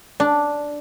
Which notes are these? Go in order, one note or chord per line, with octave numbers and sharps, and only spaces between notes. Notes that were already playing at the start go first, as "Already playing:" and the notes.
D4